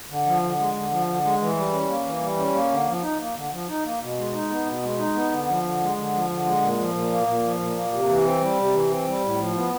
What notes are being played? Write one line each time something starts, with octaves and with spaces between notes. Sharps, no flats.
D3
F3
D3
G#3
D3
F3
D3
G#3
E3
G3
C#4
A#3
E3
G3
C#4
A#3
D3
F3
D#4
A#3
D3
F3
D#4
A#3
B2
G#3
D#4
B3
B2
G#3
D#4
B3
D3
F3
D3
G#3
D3
F3
D3
G#3
A#2
F3
A#2
A#3
A#2
F3
A#2
A#3
C3
E3
C4
G3
C3
E3
C4
G3
A2
F3
B3